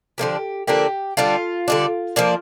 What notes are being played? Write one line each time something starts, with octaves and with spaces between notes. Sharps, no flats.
D3 F3 A#3 D4 G4
D3 F3 A#3 D4 G4
D3 G3 D4 F4
D3 G3 D4
F3 A#3 D4